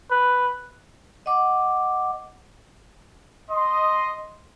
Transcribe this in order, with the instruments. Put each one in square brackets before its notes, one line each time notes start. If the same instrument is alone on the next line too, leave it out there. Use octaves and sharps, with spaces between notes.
[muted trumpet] B4
[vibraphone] D#5 F#5 D6
[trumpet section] D#5 C6